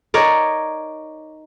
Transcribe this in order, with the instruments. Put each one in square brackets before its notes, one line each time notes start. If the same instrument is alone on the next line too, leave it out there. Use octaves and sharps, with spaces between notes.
[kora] D#4 A#4 C#5 D5